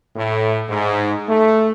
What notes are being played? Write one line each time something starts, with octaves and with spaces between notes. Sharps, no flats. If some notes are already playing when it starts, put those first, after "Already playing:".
A2
G#2
A3